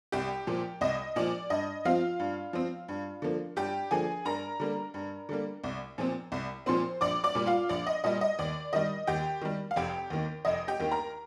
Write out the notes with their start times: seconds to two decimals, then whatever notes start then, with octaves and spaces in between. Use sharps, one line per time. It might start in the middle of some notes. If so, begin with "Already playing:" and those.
0.12 C2 G4 G5
0.47 A#2 F3
0.81 C2 D#5
1.16 A#2 F3 D5
1.50 G2 D#5
1.85 F3 C4 F4 F5
2.20 G2
2.53 F3 C4
2.88 G2
3.22 D3 F3 A#3
3.56 G2 G4 G5
3.91 D3 F3 A#3 G#4 G#5
4.25 G2 A#4 A#5
4.60 D3 G3 A#3
4.94 G2
5.29 D3 G3 A#3
5.64 C2
5.98 A#2 F3 C4
6.32 C2
6.66 A#2 F3 C4 C5 C6
7.01 A#1 D5 D6
7.24 D5 D6
7.35 A#2 G3
7.46 F4 F5
7.69 A#1 D5
7.87 D#5
8.04 A#2 G3 D#5
8.21 D#5
8.39 D#2 D5
8.73 D#3 G3 D#5
9.07 D#2 G4 G5
9.42 D#3 G3
9.71 F5
9.76 F1 G4 G5
10.10 D#2 D#3 A#3
10.45 F1 D#5
10.68 G4 G5
10.80 D#2 D#3 A#3
10.91 A#4 A#5